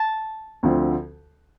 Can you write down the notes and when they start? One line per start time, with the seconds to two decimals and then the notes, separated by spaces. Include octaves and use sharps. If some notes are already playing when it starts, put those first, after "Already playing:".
Already playing: A5
0.63 D2 D3 F3 C4